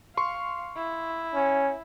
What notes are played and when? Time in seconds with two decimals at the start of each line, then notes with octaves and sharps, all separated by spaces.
0.17 F5 C6 C#6
0.77 E4
1.35 C#4